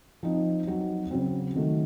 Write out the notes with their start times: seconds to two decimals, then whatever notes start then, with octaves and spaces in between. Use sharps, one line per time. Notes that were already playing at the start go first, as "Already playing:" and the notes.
0.23 F3 C4 D#4
0.67 F#3 C4 D#4 F#4
1.11 C#3 F#3 C4
1.56 D#3 F#3 A3